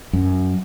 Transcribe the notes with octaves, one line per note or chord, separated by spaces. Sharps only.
F#2